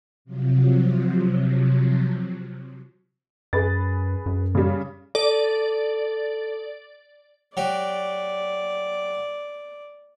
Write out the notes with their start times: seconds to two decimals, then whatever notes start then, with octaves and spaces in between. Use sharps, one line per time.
0.25 C3 F3 F#3
3.53 F#2 G#4 B4 A6
4.26 F#2
4.55 C#3 G3
5.15 A4 D5
7.57 F#3 G4 D5